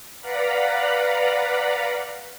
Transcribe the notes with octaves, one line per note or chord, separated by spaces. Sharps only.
B4 D5 F5 F#5 A#5 B5